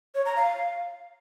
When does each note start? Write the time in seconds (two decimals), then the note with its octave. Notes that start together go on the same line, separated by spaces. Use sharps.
0.15 C#5
0.25 A#5
0.36 F5